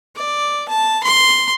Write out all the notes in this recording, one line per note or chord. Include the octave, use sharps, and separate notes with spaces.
D5
A5
C6